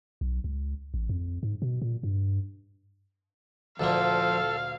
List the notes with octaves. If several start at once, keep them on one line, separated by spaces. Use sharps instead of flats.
B1
C#2
A1
F2
G#2
B2
A#2
G2
D2 A#2 F3 A#3 A4 F5